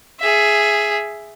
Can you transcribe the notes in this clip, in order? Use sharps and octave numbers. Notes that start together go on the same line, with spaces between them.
G#4 E5